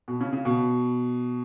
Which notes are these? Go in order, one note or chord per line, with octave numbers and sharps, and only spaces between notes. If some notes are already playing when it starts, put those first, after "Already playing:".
B2
C#3
C#3
B2